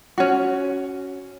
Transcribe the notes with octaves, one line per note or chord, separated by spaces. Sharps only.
C#4 F#4